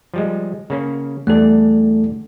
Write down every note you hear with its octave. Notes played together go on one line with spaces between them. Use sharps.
F3 G3 G#3
C#3 A#3 C#4
E2 G3 A3 D4 A4